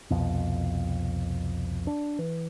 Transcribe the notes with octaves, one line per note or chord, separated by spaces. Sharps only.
C2 F2 B2
D4
E3